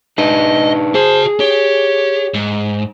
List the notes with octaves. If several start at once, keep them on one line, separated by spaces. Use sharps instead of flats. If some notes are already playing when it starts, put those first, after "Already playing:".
D4 D#4 B4 D#5
F#4 G#4 C5 A5
G4 C#5
G#2